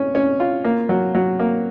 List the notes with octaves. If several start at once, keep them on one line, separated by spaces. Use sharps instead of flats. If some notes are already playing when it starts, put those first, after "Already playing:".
Already playing: C#4
C#4
F4
A#3
F#3
F#3
A#3